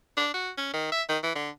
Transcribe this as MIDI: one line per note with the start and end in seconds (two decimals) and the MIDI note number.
0.17 0.31 62
0.34 0.50 66
0.58 0.70 61
0.73 0.88 51
0.92 1.02 76
1.09 1.18 51
1.23 1.32 52
1.35 1.50 50